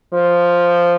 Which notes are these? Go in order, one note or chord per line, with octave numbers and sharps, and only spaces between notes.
F3